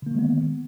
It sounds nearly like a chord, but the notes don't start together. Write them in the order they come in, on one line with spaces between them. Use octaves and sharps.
D3 A#3 D#3 G#3 B3